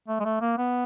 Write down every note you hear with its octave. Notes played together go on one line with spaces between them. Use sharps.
A3
G#3
A3
A#3
B3